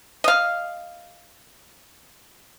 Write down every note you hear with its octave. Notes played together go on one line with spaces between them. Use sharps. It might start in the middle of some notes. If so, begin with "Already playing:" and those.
D#5 F5